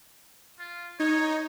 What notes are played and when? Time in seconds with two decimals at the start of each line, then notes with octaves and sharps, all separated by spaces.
0.59 F4
1.00 D#4 C#5